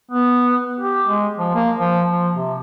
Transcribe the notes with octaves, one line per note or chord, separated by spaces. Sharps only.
B3
G4
G#3
F3
A#3
F3
F3
C3